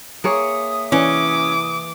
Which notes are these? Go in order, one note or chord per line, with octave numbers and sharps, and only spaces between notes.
A#3 G#4 C#5 E5 D#6
C3 E3 C#4 E4 D6 D#6